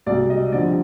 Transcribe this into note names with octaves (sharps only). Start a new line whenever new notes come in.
C2 B2 G#3 D5
D#5
F2 D3 G3 D5